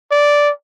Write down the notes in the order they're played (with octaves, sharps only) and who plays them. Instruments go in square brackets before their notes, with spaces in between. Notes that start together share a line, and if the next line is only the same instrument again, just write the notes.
[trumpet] D5